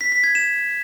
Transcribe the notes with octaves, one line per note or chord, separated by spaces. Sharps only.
B6
B6
G#6
E7